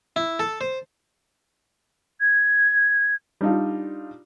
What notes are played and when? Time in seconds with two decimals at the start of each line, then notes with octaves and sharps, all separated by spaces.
0.16 E4
0.39 A4
0.61 C5
2.20 G#6
3.41 G3 D4 D#4 F4